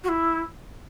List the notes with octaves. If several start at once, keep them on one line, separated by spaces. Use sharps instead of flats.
F#4
E4